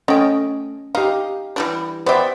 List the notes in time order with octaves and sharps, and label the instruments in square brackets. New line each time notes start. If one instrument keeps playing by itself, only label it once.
[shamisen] A3 G5 [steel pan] C#4 D#5
[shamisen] D#4 [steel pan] G4 F5
[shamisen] E3 G3 D4
[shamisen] B3 G4 [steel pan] C5 D5 E5